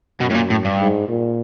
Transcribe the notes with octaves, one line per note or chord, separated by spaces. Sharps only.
F#2 B2
A2
A#2
A2
G2
G#2
A#2